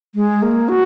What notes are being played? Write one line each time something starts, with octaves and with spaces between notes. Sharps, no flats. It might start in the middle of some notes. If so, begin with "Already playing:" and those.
G#3
A#3
F#4